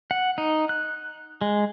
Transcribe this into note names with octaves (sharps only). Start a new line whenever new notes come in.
F#5
D#4
F#6
G#3